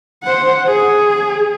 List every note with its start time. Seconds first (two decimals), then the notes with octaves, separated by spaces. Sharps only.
0.24 C5 F#5
0.66 G#4